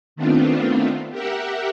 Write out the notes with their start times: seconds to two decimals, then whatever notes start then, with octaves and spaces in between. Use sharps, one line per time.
0.16 D#3 A3 B3 C4 D4 F4
1.11 G4 A#4 E5 F#5